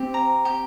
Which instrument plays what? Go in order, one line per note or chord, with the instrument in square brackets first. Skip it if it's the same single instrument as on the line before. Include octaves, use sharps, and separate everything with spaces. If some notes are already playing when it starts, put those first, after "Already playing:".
Already playing: [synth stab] C4 [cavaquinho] G4
[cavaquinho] A#5
G4